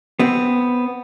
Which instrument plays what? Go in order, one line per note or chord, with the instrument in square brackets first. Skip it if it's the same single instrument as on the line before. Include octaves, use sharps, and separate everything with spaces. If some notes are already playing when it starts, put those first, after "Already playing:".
[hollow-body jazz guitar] B3 C4